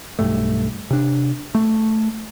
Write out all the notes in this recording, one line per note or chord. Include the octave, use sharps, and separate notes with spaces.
B1 G2 A3
C3 D4
A3